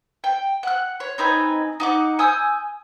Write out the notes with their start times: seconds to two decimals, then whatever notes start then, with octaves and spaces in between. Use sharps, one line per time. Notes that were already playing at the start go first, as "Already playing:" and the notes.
0.24 G5
0.63 F#5 F#6
1.00 C#5
1.18 C4 D#4 B4 G#5
1.80 D#4 F#5 D6
2.19 G#5 D#6 E6 G6